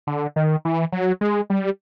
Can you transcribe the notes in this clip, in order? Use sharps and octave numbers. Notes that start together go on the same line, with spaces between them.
D3
D#3
E3
F#3
G#3
G3